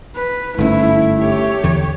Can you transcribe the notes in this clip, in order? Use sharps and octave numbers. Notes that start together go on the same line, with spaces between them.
B4
G1 G#2 A3 C#4 E4
G4 C#5
E2 D3